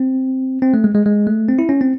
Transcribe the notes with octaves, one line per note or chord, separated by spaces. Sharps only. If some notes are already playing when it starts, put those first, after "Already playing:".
Already playing: C4
C4
A3
G#3
G#3
G#3
A3
C4
E4
C#4
C4